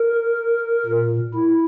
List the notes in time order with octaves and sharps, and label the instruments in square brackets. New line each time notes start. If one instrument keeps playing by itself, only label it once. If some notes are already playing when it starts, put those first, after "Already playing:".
Already playing: [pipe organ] A#4
A#2
E4